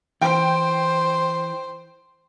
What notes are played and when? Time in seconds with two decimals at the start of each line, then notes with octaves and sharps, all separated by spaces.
0.22 E3 C5 G5